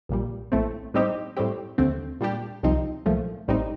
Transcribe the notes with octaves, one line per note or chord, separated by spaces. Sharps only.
A#1 A#2 G3
A#1 A2 A3 C4
A2 G3 C4 D#4 G4
A2 G3 C4 G4
D#2 D3 A3 C4
A#2 G3 D4 G4
C2 C3 F3 C4 D#4
C2 A#2 F3 A3
A1 A2 G3 C4 D#4